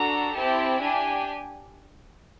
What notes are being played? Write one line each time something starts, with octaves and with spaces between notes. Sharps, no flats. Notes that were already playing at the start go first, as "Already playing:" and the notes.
Already playing: D4 F#4 A4 A#5
C4 E4 G4 A5
D4 G4 G#5